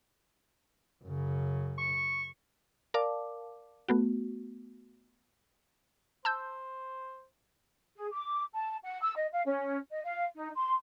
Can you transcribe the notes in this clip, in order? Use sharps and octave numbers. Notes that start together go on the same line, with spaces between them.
F#2 C#3
C#6
A#4 D5 F5 A5 D6
A3 B3 F#4
C5 A5 E6 G6
G#4
D6
A5
F#5
E6
D#5
F5
C#4
D#5
F5
D#4
C6